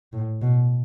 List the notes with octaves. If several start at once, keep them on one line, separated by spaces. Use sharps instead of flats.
A2
B2